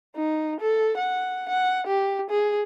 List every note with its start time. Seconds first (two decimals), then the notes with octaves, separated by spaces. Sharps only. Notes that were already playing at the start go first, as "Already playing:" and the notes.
0.16 D#4
0.60 A4
0.97 F#5
1.49 F#5
1.87 G4
2.30 G#4